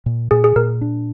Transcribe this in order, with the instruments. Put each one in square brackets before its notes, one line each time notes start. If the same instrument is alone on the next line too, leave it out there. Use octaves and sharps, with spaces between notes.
[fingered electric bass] A#2
[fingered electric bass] A#2 [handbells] G#4
[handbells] G#4
[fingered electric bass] A#2 [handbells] A#4
[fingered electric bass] D4